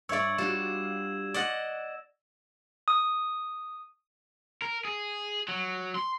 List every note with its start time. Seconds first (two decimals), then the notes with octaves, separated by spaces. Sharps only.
0.09 G2 C#5 D5 E5 E6 G#6
0.38 G3 D4 F4 F#4 E7
1.34 D5 D#5 F#5
2.88 D#6
4.62 A#4
4.85 G#4
5.48 F#3
5.96 C6